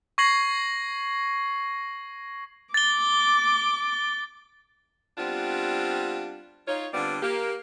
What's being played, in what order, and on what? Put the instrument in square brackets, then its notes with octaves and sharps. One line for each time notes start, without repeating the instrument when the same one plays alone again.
[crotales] C#6 G#6 A#6 C7 F#7
[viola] D6 [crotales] A6 G7
[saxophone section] G3 B3 C4 D4 F4
D#4 F4 C#5
D3 G3 B3 C4 F4 D5
A#3 G4